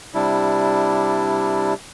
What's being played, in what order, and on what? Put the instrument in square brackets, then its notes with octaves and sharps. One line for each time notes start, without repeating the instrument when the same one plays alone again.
[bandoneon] C3 G3 D4 E4